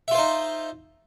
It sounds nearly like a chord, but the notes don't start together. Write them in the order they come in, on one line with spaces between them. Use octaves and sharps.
E5 F4 C5 D#4